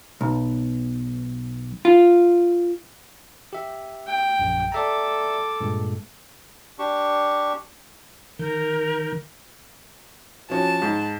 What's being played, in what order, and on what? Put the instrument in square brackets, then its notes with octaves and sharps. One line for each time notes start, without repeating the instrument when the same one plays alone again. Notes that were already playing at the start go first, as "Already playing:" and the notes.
[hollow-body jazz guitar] B1
F4
[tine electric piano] G4 E5
[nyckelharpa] G5
[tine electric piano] A#1 F#2
[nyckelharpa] A4 D6 [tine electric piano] D5 E5 A#5
[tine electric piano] G2 A#2 G#3
[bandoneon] D4 G4 C#6
[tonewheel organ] D#3 G6 [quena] A#4
[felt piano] F3 C#4 F#4 [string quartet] A5
[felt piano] G#2